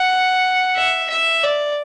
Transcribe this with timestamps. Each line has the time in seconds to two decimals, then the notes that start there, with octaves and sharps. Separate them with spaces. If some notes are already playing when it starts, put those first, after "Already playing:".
Already playing: F#5
0.76 E5
1.09 E5
1.43 D5